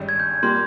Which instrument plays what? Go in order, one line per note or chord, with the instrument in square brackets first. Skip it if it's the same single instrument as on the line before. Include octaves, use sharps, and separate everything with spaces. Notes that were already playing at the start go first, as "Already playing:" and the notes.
Already playing: [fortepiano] G#1 G2 G3 C#4
[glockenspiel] G#6
G6
[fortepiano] G3 A#3 [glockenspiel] C6